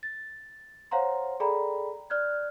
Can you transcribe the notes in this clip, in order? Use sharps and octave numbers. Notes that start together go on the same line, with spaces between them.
A6
C5 C#5 F5 F#5 A#5 C6
G#4 A4 D5 G5 A#5 B5
D5 F6 F#6 G#6